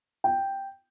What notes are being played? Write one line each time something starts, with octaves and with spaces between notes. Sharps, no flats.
G5